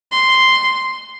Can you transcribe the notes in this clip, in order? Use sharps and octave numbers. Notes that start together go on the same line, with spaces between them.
C6